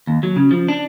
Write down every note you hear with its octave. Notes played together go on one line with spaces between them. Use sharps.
D#2
F#3
C#3
F3
D4